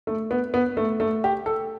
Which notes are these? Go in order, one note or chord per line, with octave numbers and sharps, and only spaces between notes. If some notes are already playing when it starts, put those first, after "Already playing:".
A3
B3
B3
A3
A3
G4
A4